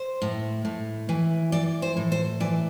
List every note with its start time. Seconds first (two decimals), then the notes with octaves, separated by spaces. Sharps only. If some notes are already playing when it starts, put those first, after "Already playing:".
Already playing: C5
0.22 A2
0.65 A2
1.09 E3
1.52 E3 D5
1.82 C5
1.97 A2
2.12 C5
2.40 E3 D5